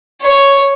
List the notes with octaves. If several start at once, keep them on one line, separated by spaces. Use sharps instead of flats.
C#5